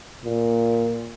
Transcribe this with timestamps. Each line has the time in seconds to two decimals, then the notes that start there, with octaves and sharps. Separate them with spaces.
0.25 A#2